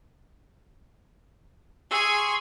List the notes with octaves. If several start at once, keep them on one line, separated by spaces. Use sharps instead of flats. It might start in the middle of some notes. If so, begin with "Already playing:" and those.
G#4 G#5 C6 C#6 E6